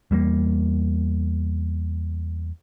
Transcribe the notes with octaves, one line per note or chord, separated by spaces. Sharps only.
E2 G3 G#3 A#3